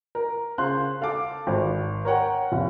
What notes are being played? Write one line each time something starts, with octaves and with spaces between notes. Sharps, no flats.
A#4
C#3 C5 F5 C6 F#6
A4 F5 A5 D6
G#1
A#4 C#5 F#5 G5
F1